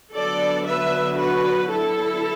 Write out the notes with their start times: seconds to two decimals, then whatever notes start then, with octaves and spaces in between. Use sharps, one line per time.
0.13 D3 F#3 B3 D4 A4 D5
0.66 B4 E5
1.18 F#4 B4
1.70 E4 A4